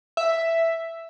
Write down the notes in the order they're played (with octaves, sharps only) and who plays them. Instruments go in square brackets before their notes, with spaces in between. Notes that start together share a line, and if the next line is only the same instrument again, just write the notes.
[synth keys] E5